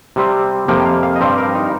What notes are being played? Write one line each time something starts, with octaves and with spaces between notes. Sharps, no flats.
C3 G3 C4
F2 C3 F3 A#3 G5
F5
F5
D#5
G2 G3 C4 C5
A#4
D#4